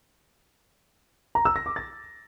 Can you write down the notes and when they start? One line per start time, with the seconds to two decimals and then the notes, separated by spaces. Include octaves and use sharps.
1.35 A#5
1.45 E6
1.56 A#6
1.66 D6
1.76 A6